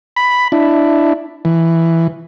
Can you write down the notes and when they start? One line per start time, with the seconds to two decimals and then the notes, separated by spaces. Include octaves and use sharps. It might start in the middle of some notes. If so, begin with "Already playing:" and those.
0.16 B5
0.52 D4 E4
1.45 E3